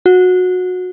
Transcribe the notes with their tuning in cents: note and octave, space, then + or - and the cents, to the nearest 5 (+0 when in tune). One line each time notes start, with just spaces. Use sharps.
F#4 -20